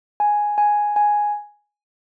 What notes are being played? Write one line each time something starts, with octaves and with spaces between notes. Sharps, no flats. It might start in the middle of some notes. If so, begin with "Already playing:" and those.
G#5
G#5
G#5